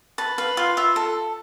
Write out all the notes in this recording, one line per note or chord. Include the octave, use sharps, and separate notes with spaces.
B4 A5
B4 F5
F4 F5
F4 E5
A4